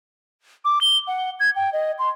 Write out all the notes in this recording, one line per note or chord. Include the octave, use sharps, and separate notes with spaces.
D6
G7
F#5
G#6
G5
D#5
C6